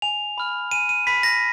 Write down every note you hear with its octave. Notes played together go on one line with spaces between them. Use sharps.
G#5 F7
B5 F6
G#5 D#7
D#7
B5 F6 B6
A#6